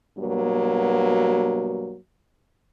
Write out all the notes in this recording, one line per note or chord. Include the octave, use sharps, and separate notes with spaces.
G2 B2 F#3 A#3